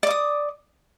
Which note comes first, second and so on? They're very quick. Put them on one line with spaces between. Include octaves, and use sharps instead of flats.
D5 D6 D#6